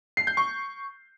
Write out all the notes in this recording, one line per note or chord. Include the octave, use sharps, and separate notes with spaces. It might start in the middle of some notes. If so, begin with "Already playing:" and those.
C7
G6
C#6